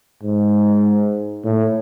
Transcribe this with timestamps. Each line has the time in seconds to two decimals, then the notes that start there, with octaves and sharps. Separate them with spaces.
0.23 G#2
1.45 A2